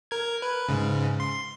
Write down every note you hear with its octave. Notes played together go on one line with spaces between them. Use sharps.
A#4 G#6
B4
G#2 C#3
C6